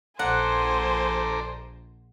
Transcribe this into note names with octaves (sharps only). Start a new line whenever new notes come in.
A#1 A4 C5 D5 F#5 G#5 A#5